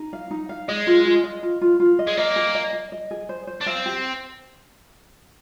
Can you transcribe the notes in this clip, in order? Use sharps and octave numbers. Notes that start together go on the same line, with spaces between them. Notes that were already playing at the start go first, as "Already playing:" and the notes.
Already playing: D#4
F5
D#4
F5
G#3 D#5
F4
F4
D#5
F4
F4
F4
D#5
G#3
A#3 D#5
G#4
D#5
D#5
D#5
G#4
C5
C5
D4
C4 F5
G4